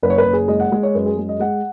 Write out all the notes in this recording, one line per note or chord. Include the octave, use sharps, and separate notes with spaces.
F#1 B4
C#5
B4
F#1
G#4
G#3 D#5
F#5
G#3
C#5
F#2 B4
G#4
G#3
D#5
G#3 F#5